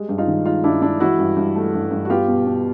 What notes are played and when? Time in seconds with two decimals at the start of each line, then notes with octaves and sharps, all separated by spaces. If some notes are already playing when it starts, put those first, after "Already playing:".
Already playing: G3 G#3
0.09 G2
0.18 D#4 F4
0.28 D#3
0.45 G#3 D#4 F4
0.63 G2 D4 E4
0.81 G#3 D4 E4
1.00 E3 E4 F#4
1.19 G2
1.37 G2
1.56 A3
1.74 G2
1.91 G2
2.05 F#4
2.10 B3 F4 G4
2.28 B2
2.46 B2